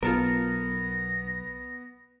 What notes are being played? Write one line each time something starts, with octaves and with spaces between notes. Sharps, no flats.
B1 B3 F4 A4 A#4 A#6